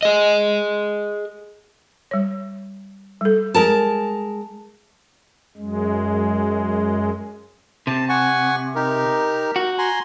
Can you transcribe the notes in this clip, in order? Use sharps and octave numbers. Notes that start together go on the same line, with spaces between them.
G#4 D#5
G3 C#5
G3 A4
G#3 A#4 A5
F#2 G#3
C3 A5
F#5 G#5 C#6
D#4 G4 A#4
F#4
G#5 A#5 C6